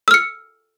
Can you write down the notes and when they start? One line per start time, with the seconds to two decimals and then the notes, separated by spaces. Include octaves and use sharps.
0.08 E6
0.11 F6
0.14 C#7